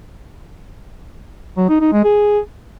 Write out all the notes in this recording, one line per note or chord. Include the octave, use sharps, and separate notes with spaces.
F#3
D#4
D#4
G#3
G#4